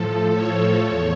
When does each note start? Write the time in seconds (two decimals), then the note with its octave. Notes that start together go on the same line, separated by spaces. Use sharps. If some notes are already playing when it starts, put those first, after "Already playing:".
Already playing: A2 F3 A4
0.34 C#5
0.84 E2